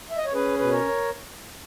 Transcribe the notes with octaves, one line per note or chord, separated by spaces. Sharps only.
E5
D#5
C#5
C#4 G#4 B4
B2 B4
A#4 C#5